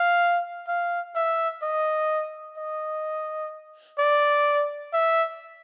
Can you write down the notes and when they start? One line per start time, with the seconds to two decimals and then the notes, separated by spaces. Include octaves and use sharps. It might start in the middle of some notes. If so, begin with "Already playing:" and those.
Already playing: F5
0.68 F5
1.15 E5
1.63 D#5
2.57 D#5
3.99 D5
4.93 E5